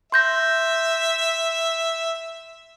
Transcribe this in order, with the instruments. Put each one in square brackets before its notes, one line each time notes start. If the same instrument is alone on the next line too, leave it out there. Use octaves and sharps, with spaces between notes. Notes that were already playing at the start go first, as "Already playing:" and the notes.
[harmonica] E5 [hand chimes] C6 G6 A#6